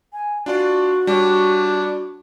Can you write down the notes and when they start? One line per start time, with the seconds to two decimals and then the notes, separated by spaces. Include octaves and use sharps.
0.13 G#5
0.46 D4 F4 F#4 D5
1.07 G3 D4 C#5